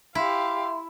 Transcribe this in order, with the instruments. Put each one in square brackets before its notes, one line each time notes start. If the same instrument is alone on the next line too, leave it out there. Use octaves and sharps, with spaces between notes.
[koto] E4 [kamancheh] G4 F5 [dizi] C6